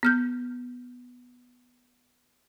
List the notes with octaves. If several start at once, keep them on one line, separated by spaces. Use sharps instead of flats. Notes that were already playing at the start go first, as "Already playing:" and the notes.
B3 F6 G6